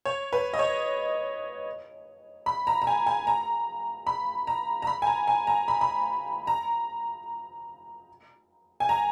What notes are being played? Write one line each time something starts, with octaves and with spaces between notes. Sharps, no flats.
C#5
B4
D#5
C#5
B5
A#5
A#5
G#5
G#5
A#5
B5
A#5
A#5
B5
G#5
A#5
G#5
A#5
B5
B5
A#5
G#5
A#5